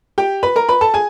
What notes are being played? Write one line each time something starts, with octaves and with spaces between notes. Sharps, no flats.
G4 G5
B4 B5
A#4 A#5
B4 B5
A4 A5
G#4 G#5